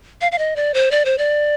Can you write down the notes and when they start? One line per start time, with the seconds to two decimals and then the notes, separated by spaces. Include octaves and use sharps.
0.21 F5
0.32 F5
0.38 D#5
0.56 D5
0.74 C5
0.91 D5
1.05 C5
1.18 D5